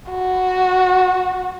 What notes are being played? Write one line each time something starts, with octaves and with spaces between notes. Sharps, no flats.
F#4